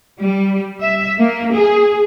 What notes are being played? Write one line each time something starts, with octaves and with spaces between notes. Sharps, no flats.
G3
E5
A#3
G#4